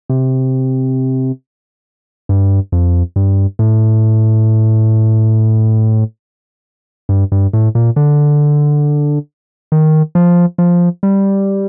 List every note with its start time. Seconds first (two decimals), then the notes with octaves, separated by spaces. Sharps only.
0.09 C3
2.29 G2
2.72 F2
3.16 G2
3.59 A2
7.09 G2
7.32 G2
7.53 A2
7.75 A#2
7.96 D3
9.72 D#3
10.15 F3
10.58 F3
11.03 G3